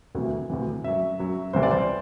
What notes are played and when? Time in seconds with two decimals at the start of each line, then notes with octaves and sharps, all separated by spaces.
0.15 D2 C3 E3
0.50 D2 C3 E3
0.84 F#2 F#3 E5
1.19 F#2 F#3
1.53 C2 C3 E3 G3 C5
1.63 D5
1.71 C5